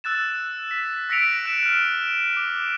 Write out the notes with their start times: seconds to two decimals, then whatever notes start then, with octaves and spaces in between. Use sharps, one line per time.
0.04 E6 F#6 A6 E7
0.71 B6
1.09 E6 A#6 B6 C#7 D7 F7
1.46 F#6 E7
1.63 F6 F#6
2.37 D6